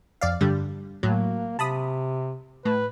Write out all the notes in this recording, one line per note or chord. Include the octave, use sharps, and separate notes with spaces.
F2 D5 F5
G2 D3 G3
A2 F#3 A#3
C3 A5 B5 D#6
A2 B4